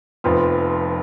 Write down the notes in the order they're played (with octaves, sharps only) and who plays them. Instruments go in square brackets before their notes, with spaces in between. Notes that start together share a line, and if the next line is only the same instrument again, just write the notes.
[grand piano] F1 F2 F3 B3 F4